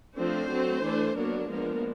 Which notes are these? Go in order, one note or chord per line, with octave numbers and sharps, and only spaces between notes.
F3 A3 C4 D4 C5
F#3 A3 C4
E3 A3 D4
F#3 A#3 B3 D4 A#4
F3 G#3 A#3 B3 D4 A#4